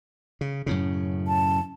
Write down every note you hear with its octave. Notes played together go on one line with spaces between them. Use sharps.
C#3
F#2 A2 C#3
A5